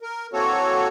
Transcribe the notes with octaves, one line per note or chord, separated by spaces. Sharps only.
A#4
E3 A#3 C4 F#4 A4 C#5